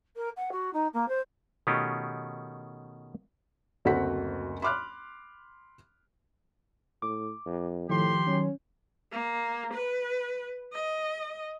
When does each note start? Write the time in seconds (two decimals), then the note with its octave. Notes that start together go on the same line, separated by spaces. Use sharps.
0.16 A#4
0.36 F#5
0.51 F#4
0.73 D#4
0.93 A#3
1.08 C5
1.67 B2 D#3 A3 C#4 F4 G4
3.85 F#1 D2 C4 F#4 F#5 B6
4.62 B5 C6 D6 F6 F#6
7.02 A2 D6
7.46 F2
7.89 A2 D#3 F3 G4 C6
8.27 D#3 F#3 C#4
9.12 A#3
9.74 B4
10.73 D#5